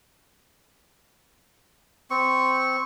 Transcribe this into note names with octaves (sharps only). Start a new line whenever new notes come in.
C4 C#6